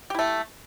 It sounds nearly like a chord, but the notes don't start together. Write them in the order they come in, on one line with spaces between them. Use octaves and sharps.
G4 E4 A3